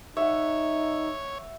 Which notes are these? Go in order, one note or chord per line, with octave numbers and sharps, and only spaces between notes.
D#4 C#5 E5 F#5